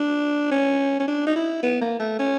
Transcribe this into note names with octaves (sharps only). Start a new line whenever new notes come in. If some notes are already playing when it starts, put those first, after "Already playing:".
Already playing: D4
C#4
C#4
D4
D#4
E4
B3
A#3
A3
C#4